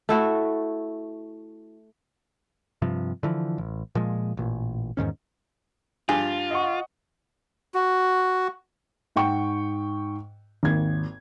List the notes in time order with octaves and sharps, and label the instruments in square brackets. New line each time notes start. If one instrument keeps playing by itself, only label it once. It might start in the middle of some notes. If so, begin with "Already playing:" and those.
[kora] A3 E4 F#4
[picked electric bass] G2 C3 F3
D3 E3 F3
A1
A#2 F3 G#3
A1 A#2
E2 G#2 D#3 C#4
[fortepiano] G2 [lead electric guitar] F4 [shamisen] G#4
[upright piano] D#5 F#5 C#6
[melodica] F#4
[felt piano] G#2 F#5 G5 C#6
G#1 D#2 G#6